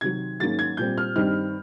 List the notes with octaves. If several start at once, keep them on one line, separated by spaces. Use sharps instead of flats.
C3 D#3 F#3 G#6
G#2 D#3 F#3 A#3 C#4 A6
G#6
A#2 G3 C4 G6
F6
G2 D#3 G3 C4 D#4 F6